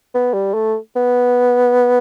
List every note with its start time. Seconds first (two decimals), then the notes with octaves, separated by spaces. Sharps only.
0.14 B3
0.34 G3
0.54 A3
0.96 B3